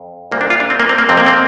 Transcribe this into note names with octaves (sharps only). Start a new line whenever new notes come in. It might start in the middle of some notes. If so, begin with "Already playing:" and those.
Already playing: F2
C2 A#2 G3 A#3
D4
F4
D4
C4
A#3
C4
A#3
F2 C3 F3 C4
A#3
C4